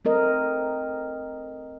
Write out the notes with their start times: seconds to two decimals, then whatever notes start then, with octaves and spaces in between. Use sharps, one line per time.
0.05 A3 C4 A#4 D#5